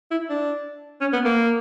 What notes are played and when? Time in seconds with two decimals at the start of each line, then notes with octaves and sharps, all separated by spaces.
0.11 E4
0.30 D4
1.01 C#4
1.13 B3
1.25 A#3